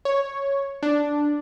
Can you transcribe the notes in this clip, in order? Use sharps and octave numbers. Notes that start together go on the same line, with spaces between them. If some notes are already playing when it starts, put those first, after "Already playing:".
C#5
D4